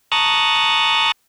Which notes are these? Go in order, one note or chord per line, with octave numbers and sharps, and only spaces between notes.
A5 A#5 C#6 D#6 F#6 A6